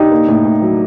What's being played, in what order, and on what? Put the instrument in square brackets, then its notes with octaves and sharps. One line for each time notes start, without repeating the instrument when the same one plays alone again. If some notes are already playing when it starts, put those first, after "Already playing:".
Already playing: [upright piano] D4 [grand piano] D#4 G4
[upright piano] A#3
A2
A2
F#3